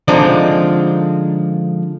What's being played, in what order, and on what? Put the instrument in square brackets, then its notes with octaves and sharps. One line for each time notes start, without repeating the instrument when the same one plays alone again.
[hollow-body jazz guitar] D3 F3 G#3 C4 D4 D#4